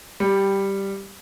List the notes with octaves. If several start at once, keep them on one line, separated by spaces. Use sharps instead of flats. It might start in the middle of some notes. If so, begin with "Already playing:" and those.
G3